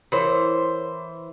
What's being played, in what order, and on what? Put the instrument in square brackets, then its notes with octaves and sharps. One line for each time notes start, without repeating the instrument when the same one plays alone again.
[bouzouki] E3 C5 [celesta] A#4 C#5 C6